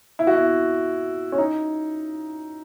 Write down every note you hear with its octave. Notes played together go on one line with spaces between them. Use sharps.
E4
F#4
E4
C#4
D#4